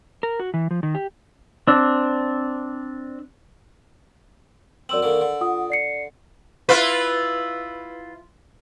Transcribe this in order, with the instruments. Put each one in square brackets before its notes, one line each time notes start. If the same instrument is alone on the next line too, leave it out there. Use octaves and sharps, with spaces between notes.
[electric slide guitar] A#4
F#4
E3
F3
D#3
G4
[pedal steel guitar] C4 D4
[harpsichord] F#2 C4 [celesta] D5 E6 F#7
[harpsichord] D3 D#3 A#3
D3
[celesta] F4 F#5 D#6
D5 C7 C#7
[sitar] E4 F4 B4